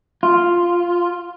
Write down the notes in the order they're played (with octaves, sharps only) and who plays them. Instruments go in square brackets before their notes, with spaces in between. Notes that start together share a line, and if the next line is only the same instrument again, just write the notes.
[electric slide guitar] F4